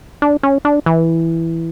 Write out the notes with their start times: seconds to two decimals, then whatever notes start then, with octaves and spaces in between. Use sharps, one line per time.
0.22 D4
0.43 C#4
0.65 D4
0.86 E3